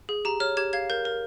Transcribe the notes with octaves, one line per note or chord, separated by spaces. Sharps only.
G#4
G4 A#5
C#5 F6
G4 G#6
F5 G#6
A#4 G6
A#4